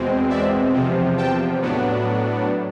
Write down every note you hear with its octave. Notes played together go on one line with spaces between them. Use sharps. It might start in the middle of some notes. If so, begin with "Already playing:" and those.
Already playing: E2 B2 G#3 C4
D5 E5
E2 C3 F3
G5 A5
A2 F#3 B3 D4